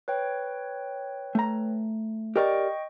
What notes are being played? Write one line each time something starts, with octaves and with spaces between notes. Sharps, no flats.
B4 C#5 G5
A3 A#5
G4 A#4 D5 D#5 G5 C#6